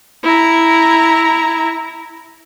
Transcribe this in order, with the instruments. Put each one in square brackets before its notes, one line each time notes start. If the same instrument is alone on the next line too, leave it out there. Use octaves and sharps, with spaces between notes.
[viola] E4 A#5